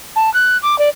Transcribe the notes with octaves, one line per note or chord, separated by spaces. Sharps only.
A5
F#6
D6
D5